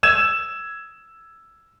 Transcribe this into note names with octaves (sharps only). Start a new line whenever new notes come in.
E6 G#6 E7